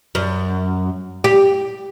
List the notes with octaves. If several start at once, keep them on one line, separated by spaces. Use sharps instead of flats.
F#2
G4